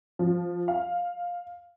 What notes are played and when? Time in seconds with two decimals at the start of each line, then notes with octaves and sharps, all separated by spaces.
0.19 F3
0.68 F5